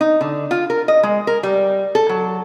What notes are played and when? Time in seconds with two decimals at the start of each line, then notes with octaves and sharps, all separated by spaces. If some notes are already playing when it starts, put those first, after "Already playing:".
0.01 D#4
0.21 D3
0.51 F4
0.70 A#4
0.88 D#5
1.03 G#3
1.27 A#4
1.43 G3
1.95 A4
2.09 F#3